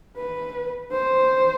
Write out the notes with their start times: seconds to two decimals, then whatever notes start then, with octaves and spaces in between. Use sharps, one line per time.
0.18 B4
0.92 C5